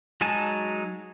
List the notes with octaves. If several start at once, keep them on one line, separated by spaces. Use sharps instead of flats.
F#3 G#3 D#4 G#5 A5